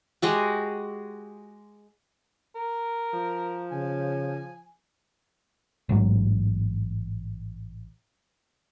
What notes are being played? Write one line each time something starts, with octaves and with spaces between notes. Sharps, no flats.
G#3 F#4 G4
A#4
F3
C#3 G#5
A1 G#2 F#3